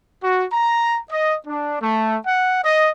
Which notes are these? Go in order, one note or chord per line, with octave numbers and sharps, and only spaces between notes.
F#4
A#5
D#5
D4
A3
F#5
D#5